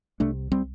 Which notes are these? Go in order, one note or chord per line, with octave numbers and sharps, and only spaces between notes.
C2 C3 A3 D4
G3 C4